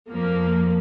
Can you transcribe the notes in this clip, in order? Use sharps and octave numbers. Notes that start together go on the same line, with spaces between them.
F2 F3 A#3